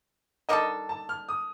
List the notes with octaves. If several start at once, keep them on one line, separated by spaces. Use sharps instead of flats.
D#3 G3 D4 A4 D#5
A5
F6
D#6